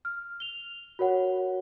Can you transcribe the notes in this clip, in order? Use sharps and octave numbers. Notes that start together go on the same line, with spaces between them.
F6
F7 G7
F#4 A#4 C#5 F#5